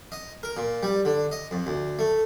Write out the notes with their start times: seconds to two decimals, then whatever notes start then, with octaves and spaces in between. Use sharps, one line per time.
0.12 D#5
0.43 A#4
0.57 A#2
0.83 G3
1.05 D3
1.32 D#5
1.51 F2
1.67 D2
1.99 A3